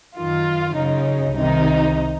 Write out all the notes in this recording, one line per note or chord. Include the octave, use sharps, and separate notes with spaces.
F#2 D#3 F4
F#2 C#3 D#4
C2 C3 D#3 D#4